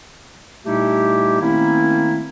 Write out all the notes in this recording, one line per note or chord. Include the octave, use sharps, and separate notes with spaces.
A#2 G3 A3 D#4 E4 G4
D#3 A3 A#3 C4 C#4 E4